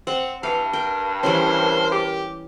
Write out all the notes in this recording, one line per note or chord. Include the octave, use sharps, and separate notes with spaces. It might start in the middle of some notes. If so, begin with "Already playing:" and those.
C4 F#5
G2 E3 F5
A#4 G5
E3 G3 C#4 A#4 C5
G4